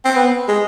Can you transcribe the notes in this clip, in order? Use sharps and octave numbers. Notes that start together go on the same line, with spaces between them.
C4
B3
G#3